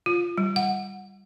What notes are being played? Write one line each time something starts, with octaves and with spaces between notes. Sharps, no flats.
F4
G3
F#5